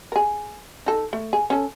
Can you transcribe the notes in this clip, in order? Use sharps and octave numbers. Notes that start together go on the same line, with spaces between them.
G#4 A#4
D#4 A4
A3
G#4
C#4 A4